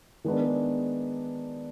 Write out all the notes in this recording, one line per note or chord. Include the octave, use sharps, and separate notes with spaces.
D#3 G#3 B3 D4